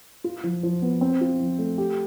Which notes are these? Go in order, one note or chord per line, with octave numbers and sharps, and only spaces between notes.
F4
F3
F3
B3
C4
F4
F3
A3
G4